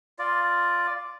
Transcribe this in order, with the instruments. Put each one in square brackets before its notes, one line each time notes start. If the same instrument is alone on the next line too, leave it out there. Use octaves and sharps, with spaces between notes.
[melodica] F4 D5